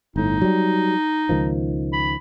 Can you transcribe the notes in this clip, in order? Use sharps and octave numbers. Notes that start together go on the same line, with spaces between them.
G1 A2 D#4
F#3 G3
C#2 D#3 F3
B5